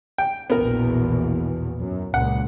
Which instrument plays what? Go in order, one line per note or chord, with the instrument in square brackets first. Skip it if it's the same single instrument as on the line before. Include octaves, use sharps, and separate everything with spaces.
[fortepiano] G5
[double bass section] A#1 E2 B2 [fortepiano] B3 A#4
[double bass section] F#2
[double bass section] C#2 A#2 [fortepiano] F#5